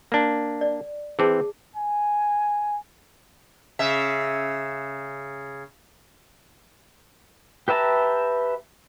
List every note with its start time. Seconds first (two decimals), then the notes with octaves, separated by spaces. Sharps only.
0.12 A#3 D4
0.61 D5
1.19 E3 C4 G#4 A5
1.76 G#5
3.79 C#3 E5
7.68 G4 B4 E5 A5 A#5